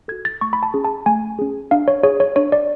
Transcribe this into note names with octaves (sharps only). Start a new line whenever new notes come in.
F#4 A4 G#6
A6
A3 C#6
B5
A5
C#4 G#4
A5
A3 G#5
C#4 G#4
D4 F5
C#5
G#4 C#5
C#5
D4 C#5
D5